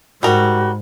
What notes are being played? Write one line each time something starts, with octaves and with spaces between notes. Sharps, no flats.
G#2 G3 F#4 A#4